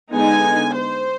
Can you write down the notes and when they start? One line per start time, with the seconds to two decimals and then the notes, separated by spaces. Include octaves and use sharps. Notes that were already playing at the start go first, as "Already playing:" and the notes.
0.13 D3 G#3 B3 D#4 G#5
0.76 C5